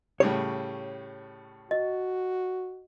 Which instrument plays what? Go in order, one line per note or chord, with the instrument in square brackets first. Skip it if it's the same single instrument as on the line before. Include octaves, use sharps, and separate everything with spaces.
[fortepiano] A2 C#3 G3 [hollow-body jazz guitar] C#5
[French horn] F#4 [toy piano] D#5